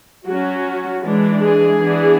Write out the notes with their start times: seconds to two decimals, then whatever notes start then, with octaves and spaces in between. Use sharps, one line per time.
0.26 F#3 C#4 F#4
1.03 E3 G#3 D4
1.42 G#4
1.79 E3 B3 D4